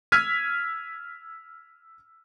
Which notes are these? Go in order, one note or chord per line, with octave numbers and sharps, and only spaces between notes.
E6 F6 G#6 B6 D#7